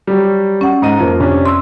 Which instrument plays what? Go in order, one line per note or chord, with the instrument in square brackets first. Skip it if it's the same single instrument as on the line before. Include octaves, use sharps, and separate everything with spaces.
[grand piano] F#3 G3
[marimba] C#4 F#5
[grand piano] G#2 D#5 D#7
[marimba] F2 [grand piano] F3 A#3
[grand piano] C3 C#4 D4
[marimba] C6 E6